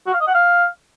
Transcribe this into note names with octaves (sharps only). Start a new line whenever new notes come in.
F#4
F5
D#5
F#5
F5